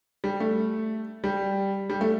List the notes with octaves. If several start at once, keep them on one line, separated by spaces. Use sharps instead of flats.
G3
A3
G3
G3
A3